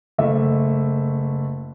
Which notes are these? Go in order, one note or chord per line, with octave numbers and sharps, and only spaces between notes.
F#1 A3 E5